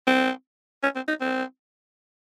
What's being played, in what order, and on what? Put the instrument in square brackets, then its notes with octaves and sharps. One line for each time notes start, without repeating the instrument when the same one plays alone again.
[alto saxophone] C4
C#4
C4
D#4
C4